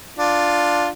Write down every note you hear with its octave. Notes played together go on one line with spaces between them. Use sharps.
D4 F4